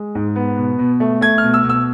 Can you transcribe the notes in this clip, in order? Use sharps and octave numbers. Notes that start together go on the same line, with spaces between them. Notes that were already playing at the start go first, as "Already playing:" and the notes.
Already playing: G#3
G#2
B3
B2
B2
A3
A3 G#6
F6
B2
E6
B2
E6